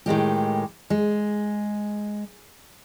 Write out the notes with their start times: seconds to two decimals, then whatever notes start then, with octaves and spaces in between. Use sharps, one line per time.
0.06 A2 D#3 G#3 G4
0.90 G#3